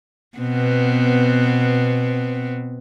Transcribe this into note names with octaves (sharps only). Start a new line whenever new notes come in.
B2 B3 C4